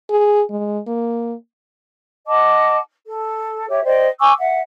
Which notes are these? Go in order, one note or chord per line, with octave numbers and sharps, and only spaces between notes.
G#4
G#3
A#3
D#5 F#5 A5 D6
A4
G4 C#5 E5
C5 D5 D#5 G5
G#5 C#6 D6 E6
E5 F#5